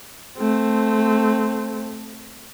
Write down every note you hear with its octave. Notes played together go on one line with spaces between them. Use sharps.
A3 C4